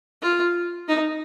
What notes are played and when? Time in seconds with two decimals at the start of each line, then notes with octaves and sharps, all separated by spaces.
0.22 F4
0.88 D#4